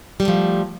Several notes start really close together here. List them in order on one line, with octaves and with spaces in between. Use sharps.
G3 A#3 A3 F3